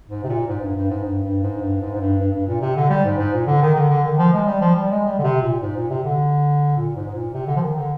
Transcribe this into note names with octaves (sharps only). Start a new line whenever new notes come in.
G#2
C3
A#2
G#2
G2
G2
G#2
G2
G2
G#2
G2
G#2
G#2
G2
G2
G2
A#2
C3
D3
G3
G#2
G#2
A#2
D3
D#3
D3
D3
D#3
F3
G#3
G3
F3
G3
G#3
G3
D3
C3
A#2
G#2
A#2
C3
D3
A#2
G#2
G#2
A#2
C3
D3
F3
D#3
D3